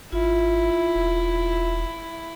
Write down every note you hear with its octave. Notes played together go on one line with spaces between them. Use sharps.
G#1 E4 F4
E1